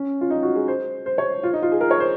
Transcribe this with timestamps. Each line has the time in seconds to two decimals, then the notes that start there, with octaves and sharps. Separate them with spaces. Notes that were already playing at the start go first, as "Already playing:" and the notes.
Already playing: C#4
0.21 F4
0.30 D#4
0.43 F#4
0.55 G#4
0.68 C5
1.06 C5
1.18 C#5
1.43 F4
1.53 D#4
1.62 F4
1.72 G#4
1.81 A#4
1.91 C#5
2.00 C5